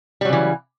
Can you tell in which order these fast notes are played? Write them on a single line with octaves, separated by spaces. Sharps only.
G3 F#3 C#3 E3